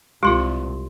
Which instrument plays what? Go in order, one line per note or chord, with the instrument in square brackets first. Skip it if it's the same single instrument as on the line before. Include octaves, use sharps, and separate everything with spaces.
[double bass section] C2 [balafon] G#3 F4 [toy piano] G4 C6